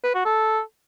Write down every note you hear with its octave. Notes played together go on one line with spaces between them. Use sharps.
B4
F#4
A4